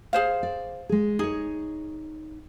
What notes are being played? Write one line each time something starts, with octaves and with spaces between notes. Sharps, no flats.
G#4 C5 F5
D5
G#3 G#4
D#4 G#4 C#5